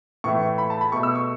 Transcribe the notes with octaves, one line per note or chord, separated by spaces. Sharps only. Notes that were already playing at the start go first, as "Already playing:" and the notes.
A2 E3 A3 C#6
B5
A5
B5
B2 A3 C#6
E6
C#6